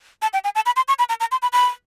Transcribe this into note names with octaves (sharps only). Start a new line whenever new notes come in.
A5
G5
G#5
A5
B5
C6
C#6
B5
A#5
A#5
C6
B5
B5